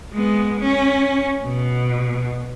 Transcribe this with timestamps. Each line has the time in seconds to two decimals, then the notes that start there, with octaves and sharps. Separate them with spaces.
0.14 G#3 B3
0.60 C#4
1.44 B2